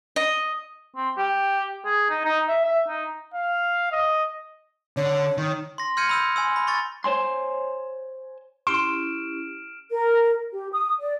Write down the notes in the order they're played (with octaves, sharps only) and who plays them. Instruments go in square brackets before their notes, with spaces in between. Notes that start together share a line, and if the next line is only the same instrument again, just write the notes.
[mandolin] D#5
[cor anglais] C4
G4
G#4
D#4
D#4
E5
E5
D#4
[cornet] F5
D#5
[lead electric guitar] D3 [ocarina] C#5
[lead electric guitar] D#3
[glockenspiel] C6 A#6
C6 F6 G6 G#6 C#7 D#7
B5 E6 G6
G#5 C6 E6
B5
B5 C#6 A6
[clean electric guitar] C5 C#5 G#5 C6
[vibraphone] C#4 E4 G4 [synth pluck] C6 [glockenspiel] F6 D7 E7
[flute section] A#4
G4
D#6
D5